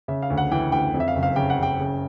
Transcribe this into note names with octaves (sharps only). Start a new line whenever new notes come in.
C#3 E5
F5
D2
F#5
E3 G5
D2 G5
F2
E5
F5
F#1
F5
C#3 G5
F#5
F#1
G5
C#3